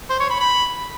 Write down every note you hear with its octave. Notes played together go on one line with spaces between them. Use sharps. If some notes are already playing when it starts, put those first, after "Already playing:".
C5
C#5
B5
B5